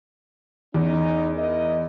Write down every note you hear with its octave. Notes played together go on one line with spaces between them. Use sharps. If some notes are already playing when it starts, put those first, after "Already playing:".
E2 C#4 D#4
E4 A#4 D#5